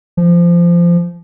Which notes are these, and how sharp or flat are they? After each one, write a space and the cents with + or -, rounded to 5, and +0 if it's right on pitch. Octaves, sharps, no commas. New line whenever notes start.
F3 -20